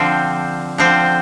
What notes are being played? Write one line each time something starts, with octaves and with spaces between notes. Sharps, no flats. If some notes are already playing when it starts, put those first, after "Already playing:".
Already playing: D3 F3 C4
D3 F3 C4